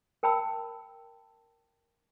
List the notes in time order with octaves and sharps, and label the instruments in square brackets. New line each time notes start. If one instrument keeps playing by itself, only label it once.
[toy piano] A#4 G5 A5 B5 E6